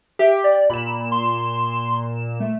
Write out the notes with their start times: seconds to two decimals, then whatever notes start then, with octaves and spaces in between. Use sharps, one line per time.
0.19 G4 E5
0.44 D5
0.70 A#2 B5 E7
1.12 C6
2.40 A3